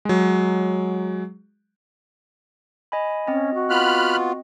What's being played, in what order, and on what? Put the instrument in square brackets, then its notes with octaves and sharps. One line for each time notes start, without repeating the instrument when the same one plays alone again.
[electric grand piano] F#3 G#3
[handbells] D#5 G#5 B5
[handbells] C4 D#5 [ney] C#4
[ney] F#4
[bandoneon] B3 F4 [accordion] B5 F6 F#6